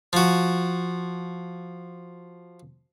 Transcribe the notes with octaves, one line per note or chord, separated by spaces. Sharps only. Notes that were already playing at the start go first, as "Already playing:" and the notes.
F3 F#4